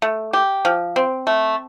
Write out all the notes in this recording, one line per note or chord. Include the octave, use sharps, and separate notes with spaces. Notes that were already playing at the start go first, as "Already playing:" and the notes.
A3
G4
F3
C4
A3